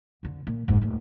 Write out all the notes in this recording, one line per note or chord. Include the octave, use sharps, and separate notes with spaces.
F2 D3
A#2
F#1 G#2
D#1 A2